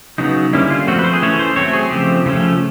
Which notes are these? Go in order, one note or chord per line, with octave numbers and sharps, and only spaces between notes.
C#3 F#3 B3 D#4
D3 G3 A#3 C#4 E4
F4
F3 A3 C4 F#4
B4
C5
G#4
E3 A3 C#4 C#5
C5
F#3 A3 C4 C#5
G#4
C#3 F3 A3 C4 G4
C#3 F3 A3 C#4